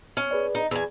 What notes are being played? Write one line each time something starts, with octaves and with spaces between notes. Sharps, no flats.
C#4
G#4 B4 D5
D#4
E2 G#4 D5 G#5